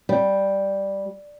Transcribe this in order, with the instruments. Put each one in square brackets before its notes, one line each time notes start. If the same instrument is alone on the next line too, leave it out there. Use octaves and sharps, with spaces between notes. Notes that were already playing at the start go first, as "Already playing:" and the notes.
[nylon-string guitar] G3